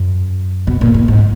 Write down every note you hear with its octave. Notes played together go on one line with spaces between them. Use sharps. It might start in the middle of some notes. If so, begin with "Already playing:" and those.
Already playing: F#2
B2
A#2
A2
G#2